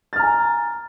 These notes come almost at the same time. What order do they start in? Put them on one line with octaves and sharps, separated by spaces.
A6 F6 A#5 G#5